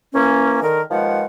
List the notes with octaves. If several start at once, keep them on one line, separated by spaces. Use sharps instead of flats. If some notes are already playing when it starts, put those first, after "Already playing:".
E3 A#3 C#4
D3 D#3 A#4
D#2 D#3 F3 G#3 B4 F#5